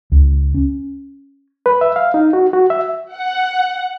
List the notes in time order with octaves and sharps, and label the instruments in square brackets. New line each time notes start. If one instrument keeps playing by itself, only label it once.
[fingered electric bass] C#2
C#4
[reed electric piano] B4
E5
F5
D#4
F#4
F#4
E5
[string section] F#5